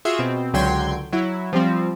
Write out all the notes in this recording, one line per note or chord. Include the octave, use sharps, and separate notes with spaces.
F4 F#4 G#4 E5
B2 C4
C#2 D3 F#3 G5 C6 G#6
F#3 E4
F3 G3 C4